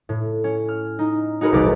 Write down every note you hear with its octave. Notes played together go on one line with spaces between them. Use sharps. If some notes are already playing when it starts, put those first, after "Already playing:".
A2
C#4
F6
D#4
D#4 F#4 G#4 A#4 B4
E1 C2 A#4 B4 D6 F6